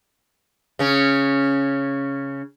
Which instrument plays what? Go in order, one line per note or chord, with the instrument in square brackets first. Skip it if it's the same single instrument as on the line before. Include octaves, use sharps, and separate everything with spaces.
[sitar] C#3 C#4